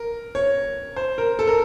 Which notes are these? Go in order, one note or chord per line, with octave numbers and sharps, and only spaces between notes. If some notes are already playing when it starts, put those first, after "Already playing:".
Already playing: A#4
C#5
C5
A#4
A4
A#4